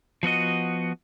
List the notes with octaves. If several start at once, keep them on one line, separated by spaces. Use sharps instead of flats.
F3 B3 F#4 D#5